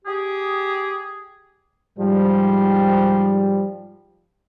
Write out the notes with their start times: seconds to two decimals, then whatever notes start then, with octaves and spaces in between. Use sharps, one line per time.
0.05 G4 G#4
1.99 G#2 F3 G3